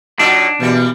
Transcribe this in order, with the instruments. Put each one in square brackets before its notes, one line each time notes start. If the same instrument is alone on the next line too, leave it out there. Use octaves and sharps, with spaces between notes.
[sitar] A#2 F#3 D#4 [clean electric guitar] D4
[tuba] B2 [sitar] E3 G3 A#3